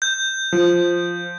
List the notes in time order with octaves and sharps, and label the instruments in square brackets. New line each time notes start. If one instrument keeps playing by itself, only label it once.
[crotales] G6
[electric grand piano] F3